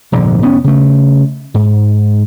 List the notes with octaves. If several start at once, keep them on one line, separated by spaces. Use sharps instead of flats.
F1 A#1 G#2 D3
F1 B3 C#4
C#3 A3
G#2